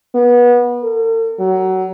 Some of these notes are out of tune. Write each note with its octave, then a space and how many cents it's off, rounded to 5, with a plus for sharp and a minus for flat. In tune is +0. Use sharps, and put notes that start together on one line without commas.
B3 -25
A4 +45
F#3 +20